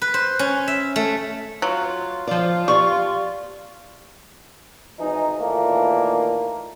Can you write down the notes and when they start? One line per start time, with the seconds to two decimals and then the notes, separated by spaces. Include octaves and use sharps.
0.02 B4
0.14 C5
0.39 C#4
0.68 E5
0.96 A3
1.62 F#3 F4
2.27 F3 F4 D5
2.68 G4 D5 F5 C#6
5.00 G#1 E3 D#4
5.41 A#2 D#3 E3 A3 A#3